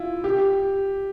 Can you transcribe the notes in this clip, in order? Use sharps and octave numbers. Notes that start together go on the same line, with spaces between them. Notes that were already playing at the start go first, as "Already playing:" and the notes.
Already playing: E4 F4
G4